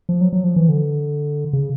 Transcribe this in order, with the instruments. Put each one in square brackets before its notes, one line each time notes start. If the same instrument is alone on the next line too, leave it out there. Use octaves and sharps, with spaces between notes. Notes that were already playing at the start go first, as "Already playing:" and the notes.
[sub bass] F3
F#3
F#3
F3
E3
D3
C#3